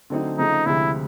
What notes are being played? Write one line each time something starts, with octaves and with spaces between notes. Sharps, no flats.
D3 F#3 A3 C4 D#4
C#3 F3 A3 D#4
D2 C3 F3 G#3 E4